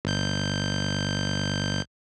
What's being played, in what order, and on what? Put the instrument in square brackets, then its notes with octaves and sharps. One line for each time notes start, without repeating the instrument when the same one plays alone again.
[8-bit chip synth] G1 G6